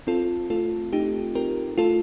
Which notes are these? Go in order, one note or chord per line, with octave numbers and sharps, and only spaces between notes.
C4 F4 A4
A3 F4 A4
A3 D#4 G4
C4 G4 A#4
A3 F4 A4